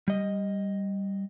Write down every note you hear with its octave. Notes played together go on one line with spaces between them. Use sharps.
G3 D#5